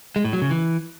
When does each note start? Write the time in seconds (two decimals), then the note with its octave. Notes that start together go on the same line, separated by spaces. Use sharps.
0.16 G#3
0.24 A2
0.33 F#3
0.42 C#3
0.50 E3